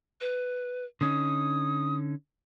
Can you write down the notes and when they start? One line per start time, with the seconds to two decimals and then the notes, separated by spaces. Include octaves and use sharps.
0.21 B4
1.01 D3 C#4 D#4 D#6